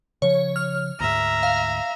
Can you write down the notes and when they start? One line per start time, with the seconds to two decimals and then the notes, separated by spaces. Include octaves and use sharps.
0.22 C#3 F3 C#5
0.56 F6
1.00 D2 G#2 E5 A#5
1.43 F5